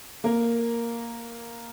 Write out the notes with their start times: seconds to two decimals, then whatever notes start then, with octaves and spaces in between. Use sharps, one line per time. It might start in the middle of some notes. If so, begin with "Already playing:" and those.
0.24 A#3 A#4